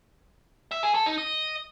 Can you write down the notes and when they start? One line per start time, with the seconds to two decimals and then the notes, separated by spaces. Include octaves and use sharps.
0.71 E5
0.83 G#4
0.95 A4
1.06 D#4
1.18 D#5